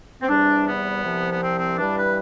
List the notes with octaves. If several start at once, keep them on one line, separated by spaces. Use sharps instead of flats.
C4
E2 C3 G3 D4
B3
C2 C3 F3
B3
C4
C4
G2 E3 G3 D4
B4